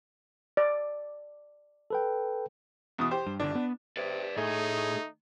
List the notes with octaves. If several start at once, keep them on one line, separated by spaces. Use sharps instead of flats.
D5
A4 B4 G5
E2 B2 D#6
G4 C5
G2
G1 D3 D4
B3
C3 B4 D5
A2 A3 D#4 G#4